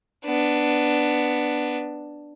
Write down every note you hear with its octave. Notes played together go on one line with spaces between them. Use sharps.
B3 D4